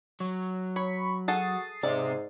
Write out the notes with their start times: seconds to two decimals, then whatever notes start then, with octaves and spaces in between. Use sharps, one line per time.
0.20 F#3 C#5
0.76 C#5 B5 C#6
1.28 F#4 G#4 A4 F#5 D#6 A6 C7
1.83 G#2 C3 D5 E5